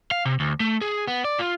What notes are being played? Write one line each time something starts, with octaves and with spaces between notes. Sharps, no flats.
F5
C3
D2
A3
G#4
B3
D5
F4